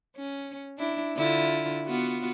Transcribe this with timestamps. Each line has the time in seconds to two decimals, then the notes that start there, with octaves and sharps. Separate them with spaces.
0.16 C#4
0.79 D4 E4
1.16 D3 E4 F4
1.87 B3 F4 F#4